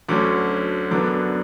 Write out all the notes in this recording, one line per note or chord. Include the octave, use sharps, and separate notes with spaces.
D2 D3 F#3 C#4 D6
F#2 D3 F#3 B3 D4 D6